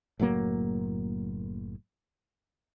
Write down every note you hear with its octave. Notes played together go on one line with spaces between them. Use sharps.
F#1 A2 F#3 A#3